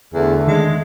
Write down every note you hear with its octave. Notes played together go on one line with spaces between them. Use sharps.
E2 D3 A3
D#3 G#3